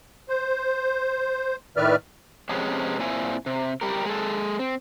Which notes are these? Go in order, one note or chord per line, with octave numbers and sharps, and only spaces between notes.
C5
A2 D#3 B4 D5 E5 F6
F2 C3 G#3 B3 C#4
A#2 C4 E4 G#5
C3
G3 G4 A#4
G#3 A4
C4